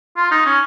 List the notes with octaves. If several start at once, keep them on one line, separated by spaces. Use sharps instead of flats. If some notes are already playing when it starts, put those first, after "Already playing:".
F4
D#4
C#4